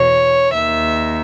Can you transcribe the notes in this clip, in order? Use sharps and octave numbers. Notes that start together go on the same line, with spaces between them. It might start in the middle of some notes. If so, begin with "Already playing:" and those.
Already playing: E2 B2 C#5
D#2 D#3 E5